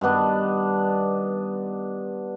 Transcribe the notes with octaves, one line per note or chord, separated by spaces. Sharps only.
G2 D#3 B3 D4